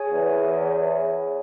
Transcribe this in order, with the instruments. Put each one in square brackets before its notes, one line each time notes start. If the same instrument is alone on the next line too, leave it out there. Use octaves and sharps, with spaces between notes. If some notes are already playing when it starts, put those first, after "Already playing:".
Already playing: [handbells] G#4 C#5 G#5
[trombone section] E2